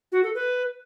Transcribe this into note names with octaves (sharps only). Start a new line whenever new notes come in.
F#4
A4
B4